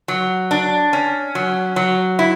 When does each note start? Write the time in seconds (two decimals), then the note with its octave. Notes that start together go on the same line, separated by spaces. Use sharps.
0.08 F#3
0.51 D4
0.93 C#4
1.35 F#3
1.76 F#3
2.19 E4